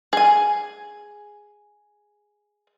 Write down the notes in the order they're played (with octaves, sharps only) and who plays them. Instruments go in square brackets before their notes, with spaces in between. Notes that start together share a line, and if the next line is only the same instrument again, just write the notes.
[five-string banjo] G#4 G#5